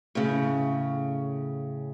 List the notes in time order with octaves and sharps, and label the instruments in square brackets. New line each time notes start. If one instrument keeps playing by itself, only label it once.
[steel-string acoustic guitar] A2 C#3